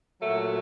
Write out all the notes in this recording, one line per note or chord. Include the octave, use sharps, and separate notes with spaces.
A#2 F#3 A3